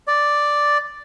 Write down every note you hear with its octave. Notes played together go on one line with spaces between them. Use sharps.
D5